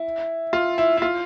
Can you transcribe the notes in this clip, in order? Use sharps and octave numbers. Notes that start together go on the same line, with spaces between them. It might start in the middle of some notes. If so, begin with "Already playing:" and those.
Already playing: E4
F4
E4
E4
F4